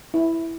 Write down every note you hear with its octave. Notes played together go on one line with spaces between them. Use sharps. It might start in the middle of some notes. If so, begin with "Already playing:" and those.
E4